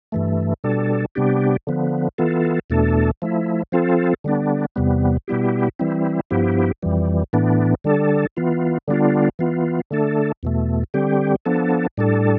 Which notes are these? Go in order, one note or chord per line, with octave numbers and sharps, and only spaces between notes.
G2 E3 A3
B2 G3 D4 A4
C3 G3 B3 D4 G4
D3 F3 B3
E3 B3 F4 A4
E2 B2 A3 D4 A4
F3 A3 E4
F3 C4 F4 A4
D3 G3 B3 D4
E2 C3 G3 B3
B2 G3 B3 E4 G4
E3 G3 C4 E4
G2 F3 B3 E4 G4
F2 E3 G3
A2 E3 B3 D4
D3 G3 D4 A4
E3 B3 F4
D3 G3 B3 D4 F4
E3 B3 F4
D3 A3 D4 A4
E2 B2 A3
D3 G3 C4 G4
F3 B3 D4 A4
A2 G3 D4 A4